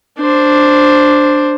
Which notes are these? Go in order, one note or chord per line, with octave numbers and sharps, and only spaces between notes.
D4 C5